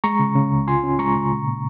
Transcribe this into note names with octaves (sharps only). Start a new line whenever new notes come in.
G#3 A#5 C#6
C#3
C#3
C#2
F4 G#5 C6
C#4
G#3 A#5 C#6
C#3
A#2
A#2